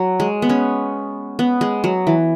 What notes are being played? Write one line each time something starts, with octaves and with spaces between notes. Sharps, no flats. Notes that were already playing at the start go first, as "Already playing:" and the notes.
Already playing: F#3
G#3
B3
C#4
B3
G#3
F#3
E3